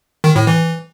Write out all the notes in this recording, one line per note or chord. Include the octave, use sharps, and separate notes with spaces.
D#3
A2
E3